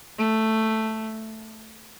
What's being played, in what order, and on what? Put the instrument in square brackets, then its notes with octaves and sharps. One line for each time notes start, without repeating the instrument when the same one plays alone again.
[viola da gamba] A3